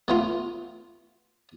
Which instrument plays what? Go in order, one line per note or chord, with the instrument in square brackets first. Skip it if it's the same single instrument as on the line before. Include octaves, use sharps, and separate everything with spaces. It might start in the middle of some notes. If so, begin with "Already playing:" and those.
[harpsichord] A3 B3 F4